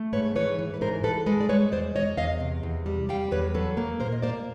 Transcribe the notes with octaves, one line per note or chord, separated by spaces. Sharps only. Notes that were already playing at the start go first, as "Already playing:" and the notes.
Already playing: A3
G#2 B4 C#5
E3 B4 C#5
E3
B4
G#2 A#4 C5
G#2 A4 B4
G#3 A4 B4
D5
G#3 B4 C#5
E2 C5 D5
E2 C#5 D#5
E2 D#5 F5
C3
E2
G3
G3 F5 G5
E2 B4 C#5
F#3 A4 B4
A#3
A#2 A#4 C5
D#5
A#3 C5 D5